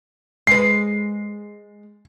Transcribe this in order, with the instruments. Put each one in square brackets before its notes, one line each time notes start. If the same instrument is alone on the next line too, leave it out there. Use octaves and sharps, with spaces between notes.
[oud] G#3 B4 [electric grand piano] C7